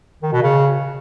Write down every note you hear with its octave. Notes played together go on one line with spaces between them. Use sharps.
D#3
B2
C#3